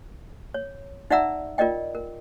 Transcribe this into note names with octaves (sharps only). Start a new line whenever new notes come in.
C#5
D#4 D5 E5 F#5 A#5 E6
F4 A#4 D5 D#5 G5
A#4